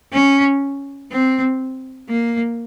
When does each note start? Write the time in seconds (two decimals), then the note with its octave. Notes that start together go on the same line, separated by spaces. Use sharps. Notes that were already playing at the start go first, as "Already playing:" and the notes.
0.13 C#4
1.11 C4
2.09 A#3